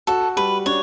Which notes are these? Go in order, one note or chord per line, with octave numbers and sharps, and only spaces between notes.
F#4 A4
G3 B4
D4 C#5